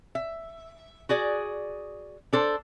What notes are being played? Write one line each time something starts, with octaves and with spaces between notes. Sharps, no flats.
E5
F#4 G#4 D5
D4 A4 C5